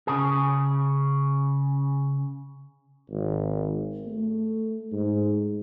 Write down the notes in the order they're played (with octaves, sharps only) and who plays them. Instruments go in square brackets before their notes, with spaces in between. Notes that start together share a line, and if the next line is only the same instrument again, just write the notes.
[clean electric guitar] C#3 G#4
[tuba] G#1
A3
G#2